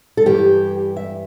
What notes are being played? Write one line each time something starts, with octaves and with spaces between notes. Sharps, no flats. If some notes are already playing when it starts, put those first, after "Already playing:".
A4
G2 E3 G3 G4
E5